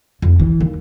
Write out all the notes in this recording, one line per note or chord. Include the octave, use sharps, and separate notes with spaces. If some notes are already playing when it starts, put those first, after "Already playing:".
F2
E3
D#2